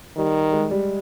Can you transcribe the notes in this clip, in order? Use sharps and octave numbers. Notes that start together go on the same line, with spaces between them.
D#3 G3
G#3
G3